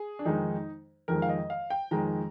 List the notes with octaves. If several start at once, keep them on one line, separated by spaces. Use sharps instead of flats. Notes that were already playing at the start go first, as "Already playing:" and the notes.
Already playing: G#4
D4
F2 D#3 G#3 D#4
F2 D#3 G#3 A#4
F5
D#5
F5
G5
F2 D#3 G#3 A#5